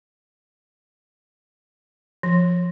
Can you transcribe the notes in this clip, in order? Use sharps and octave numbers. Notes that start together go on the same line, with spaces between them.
F3